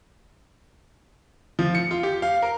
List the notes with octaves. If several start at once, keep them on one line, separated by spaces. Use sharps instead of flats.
F3
C#7
F4
G4
F5
A#4